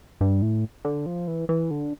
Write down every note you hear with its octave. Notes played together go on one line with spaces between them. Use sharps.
G2
A2
D3
F3
E3
E3
D3